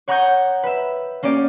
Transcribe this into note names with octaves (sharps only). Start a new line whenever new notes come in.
C#5 F#5 A#5 C#6 D#6 G6
B4 E5
A#3 C#4 G4 D5